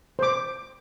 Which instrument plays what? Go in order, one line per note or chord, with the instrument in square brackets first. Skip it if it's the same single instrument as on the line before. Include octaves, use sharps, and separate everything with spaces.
[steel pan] C5 D6